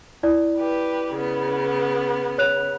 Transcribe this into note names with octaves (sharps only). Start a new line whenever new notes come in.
E4 D5
G4 B4
C#3 B3
C#5 F#6 F7